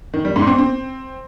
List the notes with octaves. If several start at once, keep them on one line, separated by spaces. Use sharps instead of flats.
D#3
G3
G#2
C4
C4